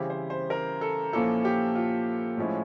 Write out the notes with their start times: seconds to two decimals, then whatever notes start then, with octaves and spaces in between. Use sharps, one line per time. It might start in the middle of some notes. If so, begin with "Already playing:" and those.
Already playing: C#3 E3 G3 C4 E4 G4
0.10 C5
0.30 C5
0.50 A#4
0.81 A4
1.13 A#2 F3 A#3 C#4 E4 A4
1.45 G4
1.75 F4
2.37 A2 F3 G#3 C#4 E4